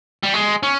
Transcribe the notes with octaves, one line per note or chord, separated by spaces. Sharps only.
G3
G#3
C#4